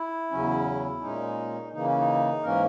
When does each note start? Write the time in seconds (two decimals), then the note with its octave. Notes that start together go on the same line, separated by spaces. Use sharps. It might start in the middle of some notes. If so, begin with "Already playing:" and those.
Already playing: E4
0.31 E2 C#3 F#3 C#4
1.01 A#2 G#3 C#4 D#4
1.73 C#3 E3 A#3 D#4
1.85 C#4
1.97 D#4
2.43 G#2 E3 A#3 C#4 A#4